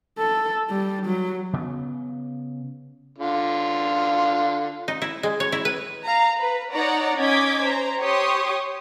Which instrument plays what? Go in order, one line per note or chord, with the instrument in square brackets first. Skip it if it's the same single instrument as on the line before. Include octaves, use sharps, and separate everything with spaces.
[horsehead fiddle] A4
G3
F#3
[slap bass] C#3 B3
[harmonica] D3 F4
[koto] D#4
E4
G#3
C#5
E4
B4
[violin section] F5 A#5
B4
D#4 C#5 D5 F#5 A#5
C#4 D#5 D6 G#6 B6
C5 A#5
G4 C#5 C6 C#6 D#6